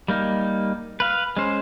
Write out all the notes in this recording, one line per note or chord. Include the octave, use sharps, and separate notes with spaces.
G3 A#3 D#4
B4 F5
G#3 C#4 C5